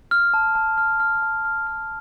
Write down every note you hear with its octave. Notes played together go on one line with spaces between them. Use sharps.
F6
A5
A5
F6
F6
A5
F6
F6